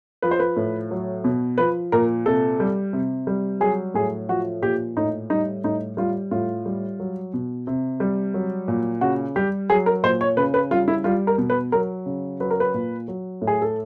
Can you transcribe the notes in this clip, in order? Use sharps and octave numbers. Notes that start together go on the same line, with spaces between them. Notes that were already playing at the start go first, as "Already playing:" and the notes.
F3 B4
C5
B4
A2
F#3
B2
F3 B4
A#2 A#4
C3 A4
G3
C3
G3
F#3 G#4
A2 G#4
F3 F#4
A#2 G4
A2 D#4
G3 D#4
A2 D#4
G3 F4
A2 F4
G3
F#3
B2
C3
G3
F#3
A#2
C#3 F#4
G3 G4
F#3 G#4
A#4
A#2 C5
C#5
C#3 B4
B4
G3 F4
E4
G3 F4
A#4
B2
B4
F#3 A#4
C#3
F#3 B4
A#4
B4
A#2
F#3
A2
G#4
A4